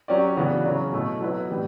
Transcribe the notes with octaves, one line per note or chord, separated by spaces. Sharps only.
F#3 C#4 G4 D5
C#3 E3 B3 D4 F#4
C#3 F#3 C#4
B2 A3 E4
F#3 B3 E4 B4
A2 E3 G3